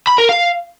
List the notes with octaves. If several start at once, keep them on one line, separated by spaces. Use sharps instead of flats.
B5
A#4
F5